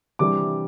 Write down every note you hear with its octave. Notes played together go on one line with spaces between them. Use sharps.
C3 E3 G3 D4 D6